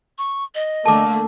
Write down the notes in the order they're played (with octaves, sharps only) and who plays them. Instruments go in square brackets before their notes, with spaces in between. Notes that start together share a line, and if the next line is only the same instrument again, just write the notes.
[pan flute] C#6
D#5
[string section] D3 A3 A#3 [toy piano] A5 D6